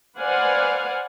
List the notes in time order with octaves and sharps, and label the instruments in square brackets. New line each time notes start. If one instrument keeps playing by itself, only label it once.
[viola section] B4 C5 D5 F5 F#5 G#5